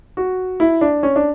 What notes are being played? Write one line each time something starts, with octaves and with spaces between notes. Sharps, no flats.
F#4
E4
D4
C#4
D4